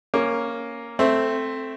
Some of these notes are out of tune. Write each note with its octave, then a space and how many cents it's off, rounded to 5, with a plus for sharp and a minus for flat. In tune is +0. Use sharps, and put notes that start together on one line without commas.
A#3 +0 C#4 +0 D6 +20
A3 +0 C4 +0